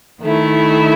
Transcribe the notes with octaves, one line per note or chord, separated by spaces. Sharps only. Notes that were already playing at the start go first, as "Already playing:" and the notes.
D#3 A3 E4